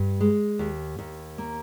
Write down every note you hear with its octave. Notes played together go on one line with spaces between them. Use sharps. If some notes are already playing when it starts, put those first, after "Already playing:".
Already playing: G2
G#3
D#2
D#2
A#3